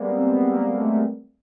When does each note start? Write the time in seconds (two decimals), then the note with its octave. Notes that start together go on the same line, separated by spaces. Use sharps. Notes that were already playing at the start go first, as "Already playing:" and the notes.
Already playing: G3 G#3 A#3 B3
0.11 C4
0.29 B3
0.37 C4
0.45 B3
0.53 A#3
0.70 G#3
0.76 A3
0.88 A3